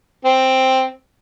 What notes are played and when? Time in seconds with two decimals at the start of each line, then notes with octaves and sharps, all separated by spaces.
0.25 C4